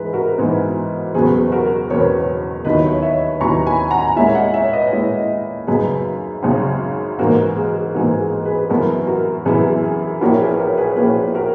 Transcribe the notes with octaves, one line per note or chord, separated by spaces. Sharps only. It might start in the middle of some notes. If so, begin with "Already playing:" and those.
Already playing: G#2 E3 E4 G#4 B4
F#4 A#4
G#2 E3 B3 E4
F#1 E2 B2 F#3 B3 G#4
F#4 A#4
F#1 E2 B2 F#3 B3 A#4 C#5
D#2 D#3 F#3 B3 E4 B4 D#5
C#5 E5
C#5 E5
D#2 D#3 F#3 B3 E4 A#5 C#6
G#5 B5
F#5 A#5
A#2 G#3 C#4 E4 E5 G#5
D#5 F#5
C#5 E5
B4 D#5
A#2 G#3 C#4 E4
G#1 F#2 C#3 G#4 B4
G#1 F#2 C#3
G#2 E3 A#3 F#4 A#4
G#4
G#2 E3 A#3 F#4
G#4
G#4 B4
F#2 E3 B3 E4 F#4 A#4
F#4 A#4
F#2 E3 B3 E4 G#4
G#4
A#1 A#2 A#3 C#4 E4 F#4 A#4
G#4 B4
A#4 C#5
G#4 B4
A#1 A#2 A#3 C#4 E4 G#4 B4
F#4 A#4